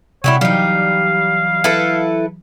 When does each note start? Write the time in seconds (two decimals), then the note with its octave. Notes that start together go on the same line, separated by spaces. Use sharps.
0.24 C3 F#3 G3 E4 C#5 F#5
0.41 E3 F#3 G3 D#4 F5
1.64 E4 A4 B4